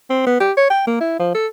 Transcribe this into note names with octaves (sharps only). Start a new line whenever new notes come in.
C4
B3
G4
C#5
G5
A#3
E4
F3
A4